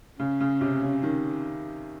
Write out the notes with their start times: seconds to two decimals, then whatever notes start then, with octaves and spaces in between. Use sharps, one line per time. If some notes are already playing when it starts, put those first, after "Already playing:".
0.19 C#3 C#4
0.40 C#3
0.61 C3
0.82 C#3
1.03 D#3